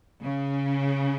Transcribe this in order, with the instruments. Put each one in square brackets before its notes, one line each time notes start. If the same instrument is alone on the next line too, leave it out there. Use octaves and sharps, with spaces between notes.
[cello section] C#3